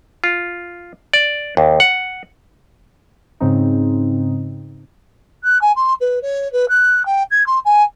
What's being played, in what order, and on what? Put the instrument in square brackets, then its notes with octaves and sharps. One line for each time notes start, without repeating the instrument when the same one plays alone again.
[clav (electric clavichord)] F4
D5
D#2
F#5
[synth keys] G#2 C#3 C4 D#4
[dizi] F#6
G#5
C6
B4
C#5
B4
F#6
G5
G#6
C6
G#5